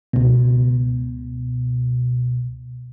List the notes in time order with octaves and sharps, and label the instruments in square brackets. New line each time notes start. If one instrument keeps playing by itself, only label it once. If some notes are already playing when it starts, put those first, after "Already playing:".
[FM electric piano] C#2 B2